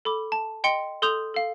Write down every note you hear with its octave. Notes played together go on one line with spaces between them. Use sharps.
A4 B5 D6
A5
D#5 G5 C6 C#7
A4 C6 D#6 G6 F7
A4 F5